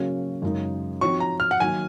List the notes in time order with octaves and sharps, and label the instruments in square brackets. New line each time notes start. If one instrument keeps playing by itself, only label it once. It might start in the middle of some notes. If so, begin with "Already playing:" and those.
Already playing: [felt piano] C#3 F#3 A#3 C#4 F#4
F#2 C#3 G#3 D#4
[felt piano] F3 C4 D#4 F#4 C#5 [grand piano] C#6
[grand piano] A#5
F6
F#5
[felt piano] D#3 F#3 A#3 [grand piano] G#5